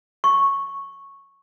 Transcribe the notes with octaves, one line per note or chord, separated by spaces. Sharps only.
C#6